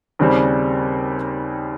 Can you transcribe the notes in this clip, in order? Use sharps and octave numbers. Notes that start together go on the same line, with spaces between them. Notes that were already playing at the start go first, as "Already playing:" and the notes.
D#2 C#3 G3 C4